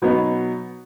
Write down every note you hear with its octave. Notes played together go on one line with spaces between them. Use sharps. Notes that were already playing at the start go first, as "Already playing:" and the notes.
B2 F#3 B3 D#4